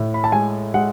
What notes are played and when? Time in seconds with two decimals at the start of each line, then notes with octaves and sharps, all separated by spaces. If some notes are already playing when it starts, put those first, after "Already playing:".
Already playing: A2
0.14 B5
0.24 A5
0.32 G#3 G#5
0.74 G#3 F#5